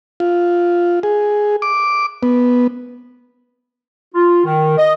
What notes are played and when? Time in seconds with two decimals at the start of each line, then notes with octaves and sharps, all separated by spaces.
0.20 F4
1.03 G#4
1.62 D6
2.23 B3
4.14 F4
4.45 D#3
4.78 D#5